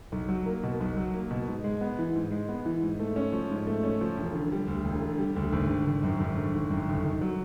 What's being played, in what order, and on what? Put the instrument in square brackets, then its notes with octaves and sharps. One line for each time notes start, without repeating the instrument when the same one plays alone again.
[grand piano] B1
F#3
A#3
B2
B1
F#3
A#3
B2
G#2
G#3
B3
E3
G#2
G#3
B3
E3
G#2
A3
C#4
F3
G#2
A3
C#4
F3
E1
D3
G3
D2
E1
D3
G3
D2
G#1
D3
G#1
F#2
G#1
D3
G#1
F#2
G1
D#3
F#3